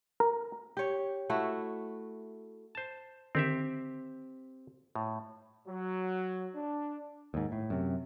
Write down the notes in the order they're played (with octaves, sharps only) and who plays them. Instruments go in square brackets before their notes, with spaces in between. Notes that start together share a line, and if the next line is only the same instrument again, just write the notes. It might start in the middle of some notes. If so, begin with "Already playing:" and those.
[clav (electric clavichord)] A#4
[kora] G4 C#5
A3 E4 F#4
[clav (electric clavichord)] C5 A5
[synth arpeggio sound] D3 D#3 [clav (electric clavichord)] C4 G4 E5
[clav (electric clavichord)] A2
[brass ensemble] F#3
D4
[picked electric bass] D#2 G#2
A2
F#2 C3